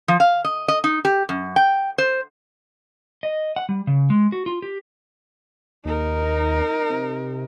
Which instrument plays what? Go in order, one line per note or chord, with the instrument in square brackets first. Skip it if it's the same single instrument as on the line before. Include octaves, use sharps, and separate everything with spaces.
[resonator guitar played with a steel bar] F3
F5
D#5
D#5
D#4
G4
F#2
G5
C5
[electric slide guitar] D#5
F#5
G3
C#3
G#3
F#4
F4
G4
[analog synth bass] D#2 [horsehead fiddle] D#4 A#4
[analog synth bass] C3